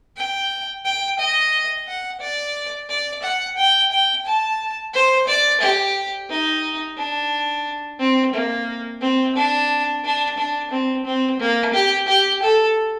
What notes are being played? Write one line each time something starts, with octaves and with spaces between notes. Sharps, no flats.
G5
G5
D#5
F#5
D5
D5
F#5
G5
G5
A5
C5
D5
G4
D#4
D4
C4
A#3
C4
D4
D4
D4
C4
C4
A#3
G4
G4
A4